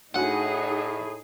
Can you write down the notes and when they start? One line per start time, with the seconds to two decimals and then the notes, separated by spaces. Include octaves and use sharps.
0.14 A2 D4 D#4 F#4 G#4 F#5 G#5